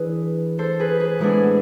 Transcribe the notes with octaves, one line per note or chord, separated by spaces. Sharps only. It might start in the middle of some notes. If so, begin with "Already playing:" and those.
Already playing: E3 D4 E4 G#4 B4
A4 C5
G#4 B4
G#4 B4
A2 G#3 B3 D4 E4 G#4